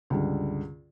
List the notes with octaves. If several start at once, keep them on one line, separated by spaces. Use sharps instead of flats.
C#2 G2 D3